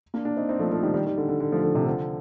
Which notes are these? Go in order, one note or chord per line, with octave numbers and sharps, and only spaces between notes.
A#3 D4
A#3 D4
C4 D#4
C4 D#4
F3 A3
F3 A3
D#3 G3
D#3 G3
D#3 G3
D3
D3
D3
F3 A3
D3 F3
C3 D#3
D3 F3